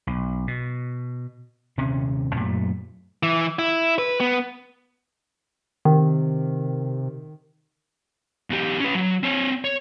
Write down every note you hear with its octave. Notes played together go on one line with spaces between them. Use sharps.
B1
B2
D#1 C3 C4 C#4
F#2 A#2 F#3 A3
E3
E4
B4
B3
C3 D#3
E2 G4
C#4 B4
F#3
C4 C#5
C#5